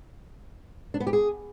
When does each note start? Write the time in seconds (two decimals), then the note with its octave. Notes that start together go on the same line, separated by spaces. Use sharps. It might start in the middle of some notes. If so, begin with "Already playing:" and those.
0.94 D4
1.00 B3
1.07 G4
1.13 G#4